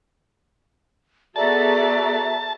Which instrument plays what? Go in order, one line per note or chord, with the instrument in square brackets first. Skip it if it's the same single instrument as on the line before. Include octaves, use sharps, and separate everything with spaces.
[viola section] B3 G#4 A4 [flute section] F#4 E5 A#5 [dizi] D5 [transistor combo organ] A5